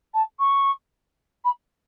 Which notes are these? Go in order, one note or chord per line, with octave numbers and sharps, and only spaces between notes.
A5
C#6
B5